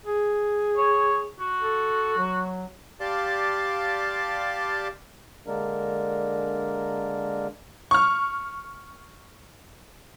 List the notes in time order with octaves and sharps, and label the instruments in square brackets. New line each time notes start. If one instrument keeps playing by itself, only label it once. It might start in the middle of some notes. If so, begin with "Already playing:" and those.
[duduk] G#4
[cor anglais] C#5
F#4
[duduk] A4
F#3
[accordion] G4 D5 F5 A5 C6 D6
D3 G#3 A#3 D4 A#4
[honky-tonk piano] C#6 F6